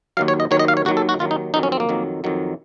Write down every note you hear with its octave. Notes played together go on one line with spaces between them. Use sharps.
D#2 D#3 F#3 F5
C#5
D#5
D#2 D#3 F#3 C#5
D#5
F5
C#5
D#2 D#3 F#3 F#4
A4
F#4
D#2 D#3 F#3 F4
D#4
F2 D#3 F#3 D#4
C#4
C4
A#3
F2 D#3 F#3
F2 D#3 F#3